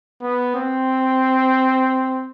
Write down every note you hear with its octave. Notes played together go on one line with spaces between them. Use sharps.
B3
C4